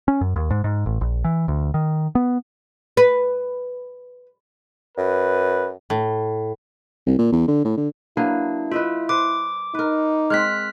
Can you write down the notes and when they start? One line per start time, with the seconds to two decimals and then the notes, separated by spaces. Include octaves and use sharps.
0.08 C#4
0.21 F#2
0.36 D#2
0.50 G#2
0.64 G#2
0.86 A1
1.01 A#1
1.24 E3
1.48 D2
1.74 D#3
2.15 B3
2.97 B4
4.97 F#2 B4
5.90 A2
7.06 C2
7.19 A#2
7.32 E2
7.48 D3
7.65 A2
7.77 D3
8.17 F#3 A#3 D4 E4 B4
8.72 F4 B4 D#5 E5
9.09 B4 C5 D6
9.74 D#4 A#4 B4
10.30 G#3 C4 F6 F#6 B6